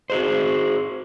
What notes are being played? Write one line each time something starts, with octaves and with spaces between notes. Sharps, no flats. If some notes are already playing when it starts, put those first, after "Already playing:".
F#4 G#4 C5